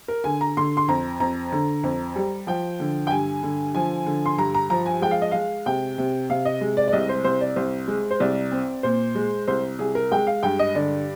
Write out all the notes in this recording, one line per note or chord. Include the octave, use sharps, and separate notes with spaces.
A#4
D3 G#5
A#5
D3 C6
C6
F2 A#5
F2 A#5
D3
F2
G3
F3 G5
D3
G5
G2 G#5
D3
F3 G#5
D3
C6
G2 A#5
A#5
F3 A#5
G#5
G#3 G5
F5
D#5
G#3 F5
C3 G5
C3
C3 F5
D#5
G#3
D5
D5
C2 D#5
C5
C2 C5
D5
C2 C5
G#3
C5
C2 D5
C4
A#2 C5
G#3
C2 C5
C2 G#4
A#4
G#3 G5
F5
G2 G5
D#5
D3 D5